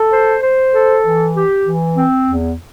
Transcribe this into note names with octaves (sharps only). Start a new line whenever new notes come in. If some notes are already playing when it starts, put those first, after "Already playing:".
Already playing: A4
C5
C5
A4
E3
G4
E3
C4
E2